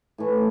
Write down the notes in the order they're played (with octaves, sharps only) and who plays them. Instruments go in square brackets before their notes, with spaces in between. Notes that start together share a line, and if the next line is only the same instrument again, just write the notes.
[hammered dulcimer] A2 E3 A3